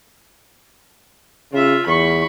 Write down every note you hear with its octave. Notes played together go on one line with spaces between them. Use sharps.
C#3 F4 E5
E2 B5 C#6